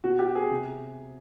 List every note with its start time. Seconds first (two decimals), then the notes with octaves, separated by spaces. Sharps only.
0.04 B2 F#4
0.19 G4
0.35 G#4
0.50 C3